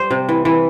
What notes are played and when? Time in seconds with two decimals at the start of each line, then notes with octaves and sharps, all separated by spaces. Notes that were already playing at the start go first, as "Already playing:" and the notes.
Already playing: G3 C5
0.11 C3
0.29 E3
0.45 E3